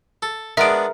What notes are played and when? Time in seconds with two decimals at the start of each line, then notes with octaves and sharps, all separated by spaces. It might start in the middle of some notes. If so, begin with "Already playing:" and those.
0.22 A4
0.57 G#3 B3 D4 A#4 E5 D7